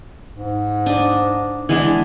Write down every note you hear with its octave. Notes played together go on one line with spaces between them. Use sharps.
G#2
D4 D#5
E3 G#3 B3 D4